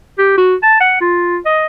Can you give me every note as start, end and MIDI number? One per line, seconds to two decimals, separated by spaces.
0.18 0.37 67
0.38 0.56 66
0.63 0.80 81
0.80 0.97 78
1.01 1.37 65
1.46 1.66 75